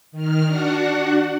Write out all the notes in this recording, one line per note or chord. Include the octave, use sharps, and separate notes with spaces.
D#3 F6
D4 F#4 F#5